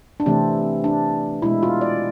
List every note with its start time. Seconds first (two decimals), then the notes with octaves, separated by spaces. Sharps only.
0.20 D4
0.26 C3 E3 A3 C4
0.84 D4
1.42 B2 G#3 E4
1.63 F4
1.81 D5